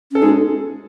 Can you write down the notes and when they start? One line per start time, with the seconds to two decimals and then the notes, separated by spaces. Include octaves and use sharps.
0.12 C#4 A4
0.22 G#3 D#4 G#4